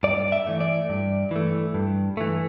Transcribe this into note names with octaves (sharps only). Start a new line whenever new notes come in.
G2 D5
E5
E3 A3
D5
G2
E3 A3
G2
E3 A3